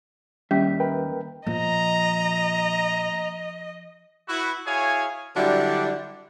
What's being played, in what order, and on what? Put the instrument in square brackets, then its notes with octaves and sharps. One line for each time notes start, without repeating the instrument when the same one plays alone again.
[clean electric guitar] D#2 E5 [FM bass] G3 [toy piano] C#4
[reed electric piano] A#4 B4 G5
[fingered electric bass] A#2 [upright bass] F3 [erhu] D#5 [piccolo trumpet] A#5
[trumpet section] E4 F#4 B4
E4 F#4 G#4 C#5 F5 G#5
[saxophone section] D3 F#3 G3 D4 E4 F#4